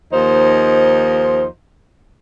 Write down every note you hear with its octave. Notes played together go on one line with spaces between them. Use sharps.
D#2 F3 D#4 C5